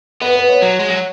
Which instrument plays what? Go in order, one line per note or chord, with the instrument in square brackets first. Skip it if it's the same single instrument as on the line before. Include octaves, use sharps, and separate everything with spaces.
[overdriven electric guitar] B3 [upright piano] B4
[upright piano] B4
C#5
[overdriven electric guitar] F#3
G#3
F#3